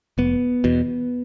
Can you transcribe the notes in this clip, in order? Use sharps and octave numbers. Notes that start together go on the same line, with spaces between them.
F1 B3
E2 B2